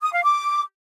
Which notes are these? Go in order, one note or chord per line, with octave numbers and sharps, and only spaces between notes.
D#6
F5
D6